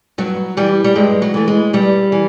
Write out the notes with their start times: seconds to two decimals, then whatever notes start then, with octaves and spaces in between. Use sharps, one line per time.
0.18 G2 F#3
0.57 E3 G3
0.84 G3
0.96 G2 G#3
1.22 F#3
1.34 E3 A3
1.48 G#3
1.73 G2 G3
2.12 E3